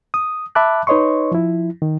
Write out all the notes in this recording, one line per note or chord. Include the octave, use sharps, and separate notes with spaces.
D#6
E5 A5 B5 D6 F#6
D#4 B4 C#5 D#5 C6 C#6
F3 E4
D#3